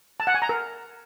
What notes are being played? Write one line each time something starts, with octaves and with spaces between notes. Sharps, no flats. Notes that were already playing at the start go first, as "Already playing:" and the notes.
A5
F#5
G#5
A#5
A#4